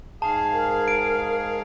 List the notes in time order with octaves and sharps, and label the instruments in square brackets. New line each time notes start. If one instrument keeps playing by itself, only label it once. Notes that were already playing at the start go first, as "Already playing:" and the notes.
[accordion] G#2 G#4 F5 [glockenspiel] A5
[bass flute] A#4
[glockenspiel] D7